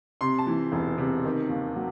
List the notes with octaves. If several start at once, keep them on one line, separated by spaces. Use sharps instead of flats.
C3 C6
A5
E3
E1
C3
D#3
D#2
F#3